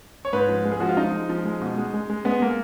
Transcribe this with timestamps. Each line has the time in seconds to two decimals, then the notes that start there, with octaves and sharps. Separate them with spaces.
0.25 C#5
0.33 G#2 B4
0.49 F3
0.65 G#3
0.72 G#4
0.80 F3 F#4
0.89 F4
0.97 F3 D#4
1.13 G#3
1.29 F3
1.45 G#3
1.61 B2
1.78 G#3
1.94 G#3
2.10 G#3
2.25 G#3 B3
2.42 G#3 A#3